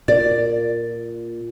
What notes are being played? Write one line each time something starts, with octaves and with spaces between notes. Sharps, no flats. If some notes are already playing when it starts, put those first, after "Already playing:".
A#2 D5